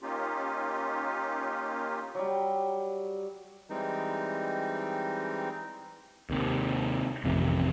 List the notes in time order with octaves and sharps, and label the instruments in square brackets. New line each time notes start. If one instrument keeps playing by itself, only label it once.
[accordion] A#3 C#4 D#4 F4 G4
[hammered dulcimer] F#3 G3
[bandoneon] E3 G3 G#3 C4 D#4
[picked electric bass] D#2 C3
A1 F2 C3 D#3